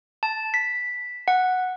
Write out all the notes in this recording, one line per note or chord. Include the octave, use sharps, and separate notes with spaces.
A5
B6
F#5